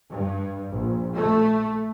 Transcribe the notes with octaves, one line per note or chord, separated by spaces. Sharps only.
G2
A#1
A3